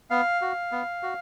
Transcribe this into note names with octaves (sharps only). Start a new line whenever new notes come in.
B3 F5
F#4
B3
F#4